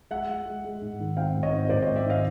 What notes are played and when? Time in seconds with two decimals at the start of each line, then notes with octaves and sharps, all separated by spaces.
0.11 G#3 E5 F#5
0.29 G#3
0.46 G#3
0.64 G#3
0.81 G#2
0.99 D#3
1.17 C4 F5 G5
1.35 G#2
1.43 C#5 D#5
1.52 C4
1.65 D#5
1.69 G#2 C5 D5
1.82 C#5 D#5
1.88 G#2
1.96 D5 E5
2.05 D#3 D#5 F5